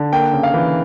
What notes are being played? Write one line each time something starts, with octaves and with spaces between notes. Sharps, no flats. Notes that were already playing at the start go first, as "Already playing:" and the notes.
Already playing: D3
A#3 G5
C#3
F5
E3